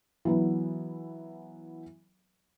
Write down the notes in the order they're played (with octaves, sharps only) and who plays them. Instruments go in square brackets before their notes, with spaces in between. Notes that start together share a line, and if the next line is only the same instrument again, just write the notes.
[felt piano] E3 F#3 B3